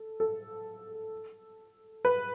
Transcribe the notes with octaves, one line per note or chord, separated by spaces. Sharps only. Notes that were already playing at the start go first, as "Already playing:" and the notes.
Already playing: A4
A4
B4